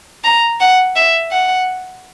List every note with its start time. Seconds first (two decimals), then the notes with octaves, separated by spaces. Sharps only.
0.24 A#5
0.60 F#5
0.96 E5
1.31 F#5